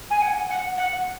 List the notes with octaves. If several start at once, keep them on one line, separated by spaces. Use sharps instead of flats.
G#5
F#5
F#5
F#5